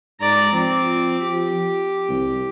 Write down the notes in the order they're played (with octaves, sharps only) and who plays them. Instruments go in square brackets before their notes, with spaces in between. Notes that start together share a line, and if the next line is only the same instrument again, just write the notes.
[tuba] G#2 [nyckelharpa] D5 A#5
[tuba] F3 [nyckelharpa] C4 D6
[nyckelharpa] G4
[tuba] C2